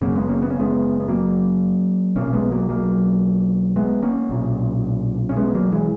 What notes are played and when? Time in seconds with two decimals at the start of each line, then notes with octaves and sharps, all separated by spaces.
0.01 F#1 F#2 C#3 A#3 C#4
0.15 G#3 B3
0.28 A#3 C#4
0.42 B3
0.50 C#4
0.59 G#3 B3
1.00 B3
1.08 F#3 A#3
2.16 B1 A#2 A#3 C#4
2.33 G#3 B3
2.51 F#3 A#3
2.69 F#3 A#3
3.76 G#3 B3
4.02 A#3 C#4
4.29 B1 A#2
5.29 C#4
5.36 G#3 B3
5.55 F#3 A#3
5.72 E3 G#3